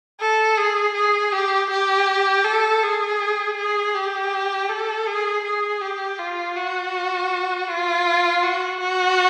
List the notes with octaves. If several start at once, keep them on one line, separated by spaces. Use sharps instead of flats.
A4
G#4
G#4
G4
G4
A4
G#4
G#4
G4
A4
G#4
G#4
G4
F4
F#4
F4
F#4
F#4